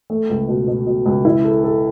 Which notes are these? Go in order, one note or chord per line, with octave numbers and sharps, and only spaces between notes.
A3
C#2
B2
B2
B2
C#2
E4
A4
A4